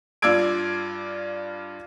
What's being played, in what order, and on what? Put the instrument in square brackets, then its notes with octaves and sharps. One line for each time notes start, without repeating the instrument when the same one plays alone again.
[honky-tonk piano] G2 F4 D5 E6 G#6 D7